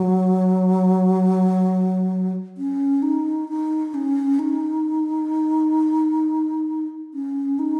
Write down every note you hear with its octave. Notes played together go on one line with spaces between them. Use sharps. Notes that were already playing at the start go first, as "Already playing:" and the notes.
Already playing: F#3
C#4
D#4
D#4
C#4
D#4
C#4
D#4